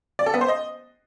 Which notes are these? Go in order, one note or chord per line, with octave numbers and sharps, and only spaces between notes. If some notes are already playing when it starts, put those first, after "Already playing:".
D5
A4
B3
C5
D#5